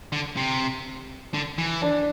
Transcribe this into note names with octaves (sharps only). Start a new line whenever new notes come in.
D3
C3
D3
E3
D4